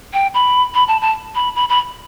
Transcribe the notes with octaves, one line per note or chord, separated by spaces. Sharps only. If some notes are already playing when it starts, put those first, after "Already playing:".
G5
B5
B5
A5
A5
B5
B5
B5